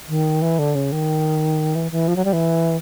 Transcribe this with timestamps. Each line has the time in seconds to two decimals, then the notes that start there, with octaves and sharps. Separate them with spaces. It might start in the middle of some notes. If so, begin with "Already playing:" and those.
0.09 D#3
0.42 E3
0.59 D3
0.75 C#3
0.92 D#3
1.75 E3
1.92 E3
2.08 F3
2.16 F#3
2.25 G3
2.33 E3